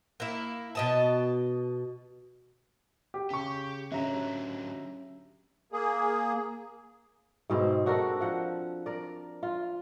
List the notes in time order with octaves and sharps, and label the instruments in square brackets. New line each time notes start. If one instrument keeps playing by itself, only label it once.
[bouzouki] A#3 E4
B2 D#5 A5
[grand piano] G4
[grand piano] C#3 C#6 [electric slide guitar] G4
[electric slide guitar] D3 F#3 [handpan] C#4 G4 C#5 [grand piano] E5 A#5
[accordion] A#3 G#4
[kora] G#2 B2 C4
D4 F#4 A4 A#4
F3 F#5
A#4 D5
F4